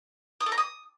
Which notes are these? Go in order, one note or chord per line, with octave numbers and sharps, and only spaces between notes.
D#6
A4
A#5
D#6